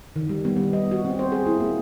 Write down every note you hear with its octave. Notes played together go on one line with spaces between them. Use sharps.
D#3
G3
B3
G3
D#5
F#4
C4
C5
G#4
E4
A#3